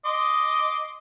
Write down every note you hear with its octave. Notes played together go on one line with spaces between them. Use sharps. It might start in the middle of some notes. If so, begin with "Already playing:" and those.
D#5 C6 D6